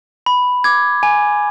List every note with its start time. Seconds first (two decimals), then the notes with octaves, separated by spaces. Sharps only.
0.26 B5
0.64 D6 G#6
1.03 G#5